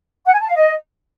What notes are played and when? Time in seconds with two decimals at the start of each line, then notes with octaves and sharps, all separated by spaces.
0.24 F#5
0.32 G#5
0.40 A5
0.47 F5
0.55 D#5